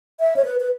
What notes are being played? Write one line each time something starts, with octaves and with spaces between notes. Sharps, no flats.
E5
C#5
B4
B4